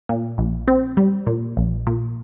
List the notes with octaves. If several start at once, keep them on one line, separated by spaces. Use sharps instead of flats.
A#2
A#1
C4
G3
A#2
A#1
A#2